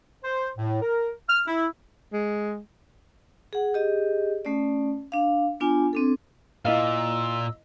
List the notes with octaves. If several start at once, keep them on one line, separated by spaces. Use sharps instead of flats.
C5
A2
A#4
F6
E4
G#3
G#4 F#5
G4 G#4 D#5
A3 C#4 D5
D4 F5
B3 D4 F4 G#5
C4 D4 A4
A#2 E4 D#5 F5 E6